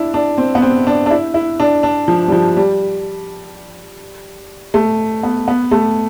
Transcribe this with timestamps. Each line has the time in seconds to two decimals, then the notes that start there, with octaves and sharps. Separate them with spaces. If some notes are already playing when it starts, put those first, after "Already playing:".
Already playing: D4 E4
0.14 D4
0.38 C4
0.55 B3
0.62 C4
0.87 D4
1.06 D4
1.11 E4
1.34 E4
1.60 D4
1.83 D4
2.08 F3
2.28 G3
2.32 F3
2.57 G3
4.74 A3
5.23 B3
5.48 B3
5.71 A3